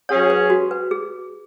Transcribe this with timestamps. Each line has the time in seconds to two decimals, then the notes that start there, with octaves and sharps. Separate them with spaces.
0.09 F#3 C#4 G#4 C#5
0.30 B4
0.50 F#4
0.71 B4
0.91 G#4